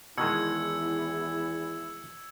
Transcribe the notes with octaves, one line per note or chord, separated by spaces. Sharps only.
E2 B2 D#3 G#3 E4 E6 G#6 C#7